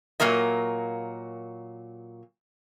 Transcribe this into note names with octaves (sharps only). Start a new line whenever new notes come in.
A#2 F#3 A#3 A#4 D#5